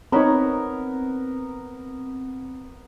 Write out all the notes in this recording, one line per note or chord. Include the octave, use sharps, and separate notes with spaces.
B3 C4 D#4 A#4 C#5 A#5 B5